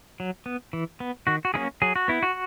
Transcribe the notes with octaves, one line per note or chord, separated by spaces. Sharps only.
F#3
B3
E3
B3
D#3 F#4
F#4
F#3 A#3 C#4 E4 G#4
F#3 G#4
F#4
B3 E4
F#4